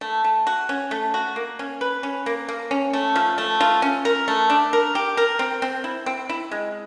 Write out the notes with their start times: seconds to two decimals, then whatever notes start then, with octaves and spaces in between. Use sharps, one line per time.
0.01 A3
0.24 A3
0.47 F#4
0.69 C#4
0.91 A3
1.14 F#4
1.36 A#3
1.59 C#4
1.81 B4
2.03 C#4
2.26 A#3
2.49 A#3
2.71 C#4
2.93 A3
3.16 F3
3.38 A3
3.61 F4
3.82 C#4
4.05 A#4
4.28 A3
4.50 D4
4.73 A#4
4.95 G4
5.17 A#4
5.39 C4
5.62 C4
5.84 E4
6.06 C4
6.29 E4
6.51 G#3